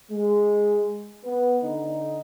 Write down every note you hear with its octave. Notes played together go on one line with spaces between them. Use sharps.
G#3
B3
D3 D#4